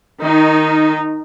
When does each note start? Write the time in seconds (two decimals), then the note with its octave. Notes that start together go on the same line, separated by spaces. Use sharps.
0.20 D#3 D#4